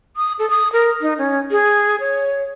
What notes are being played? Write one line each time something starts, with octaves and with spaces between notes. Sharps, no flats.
D#6
A4
D#6
A#4
D#4
C#4
G#4
C#5